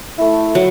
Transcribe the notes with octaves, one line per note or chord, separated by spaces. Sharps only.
A3 E4
F#3